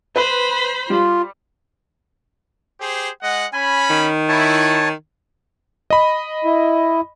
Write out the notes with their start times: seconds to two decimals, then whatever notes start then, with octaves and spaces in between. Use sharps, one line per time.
0.16 B4 C5 B5
0.90 G3 F4
2.80 G4 G#4 C5
3.22 G#3 D#5 F#5
3.53 C#4 G#5 B5
3.90 D#3
4.29 E4 C#5 A5
5.90 D#5 B5
6.44 E4